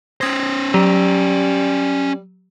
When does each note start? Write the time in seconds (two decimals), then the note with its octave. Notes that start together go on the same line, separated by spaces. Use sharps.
0.21 C#4 C5 D#6 G#6 A#6
0.74 F#3 G3 G4